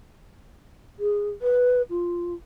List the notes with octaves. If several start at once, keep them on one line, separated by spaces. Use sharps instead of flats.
G#4
B4
F4